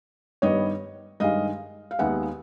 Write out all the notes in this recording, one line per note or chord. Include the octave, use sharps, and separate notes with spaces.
G2 D#3 G3 B3 C#5 D#5
G2 D#3 G#3 D#5 F5
F5
D#2 D#3 G#3 B3 E5 F#5